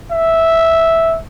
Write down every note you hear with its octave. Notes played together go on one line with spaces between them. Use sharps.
E5